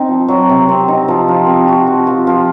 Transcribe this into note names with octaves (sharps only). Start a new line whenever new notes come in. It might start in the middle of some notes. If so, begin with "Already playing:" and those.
Already playing: C4 D#4
F3
F#3
C3
C4
D#4
F3
F3
C4
F#4
F3
F3
F3